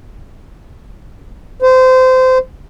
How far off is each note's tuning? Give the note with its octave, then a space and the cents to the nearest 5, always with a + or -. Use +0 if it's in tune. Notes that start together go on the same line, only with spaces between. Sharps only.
C5 -25